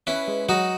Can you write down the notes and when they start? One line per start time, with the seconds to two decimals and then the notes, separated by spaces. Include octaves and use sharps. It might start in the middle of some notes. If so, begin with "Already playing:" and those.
0.07 C#4 E4 B4
0.28 G#3
0.49 F#3 D#4 F#4